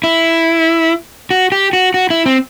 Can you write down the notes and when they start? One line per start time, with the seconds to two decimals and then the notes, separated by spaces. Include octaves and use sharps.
0.04 E4
1.31 F#4
1.52 G4
1.73 F#4
1.94 F#4
2.10 E4
2.26 C4